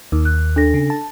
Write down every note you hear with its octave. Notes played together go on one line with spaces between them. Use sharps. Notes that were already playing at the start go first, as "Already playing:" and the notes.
D#2 D#4
F#6
D4 A4 A#6
C#3
A5